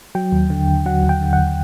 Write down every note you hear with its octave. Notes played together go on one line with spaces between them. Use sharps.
F#3 G5
D#2
D3
D#2
F#3 F#5
D#2
G5
D3
F#5
D#2